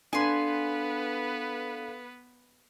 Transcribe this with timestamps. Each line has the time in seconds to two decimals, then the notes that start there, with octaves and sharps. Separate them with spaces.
0.13 B3 D4 A4 B4 F5 G#5 C6